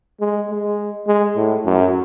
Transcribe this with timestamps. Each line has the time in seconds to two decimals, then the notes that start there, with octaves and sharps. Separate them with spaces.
0.20 G#3
0.50 G#3
1.07 G#3
1.37 A2
1.66 F#2